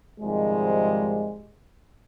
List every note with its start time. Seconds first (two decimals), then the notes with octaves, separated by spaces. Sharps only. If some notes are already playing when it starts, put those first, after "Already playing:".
0.20 G#2 C3 D#3 F3 G3 G#3